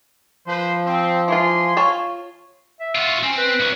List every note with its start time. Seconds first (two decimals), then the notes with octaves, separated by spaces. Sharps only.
0.47 F3 B4 C5
0.85 C4
1.28 E3 F4 G#5 C6
1.77 F4 C#5 A5
2.80 E5
2.95 F4 F#4
3.23 C4 C#4
3.37 B4
3.60 C2 F#3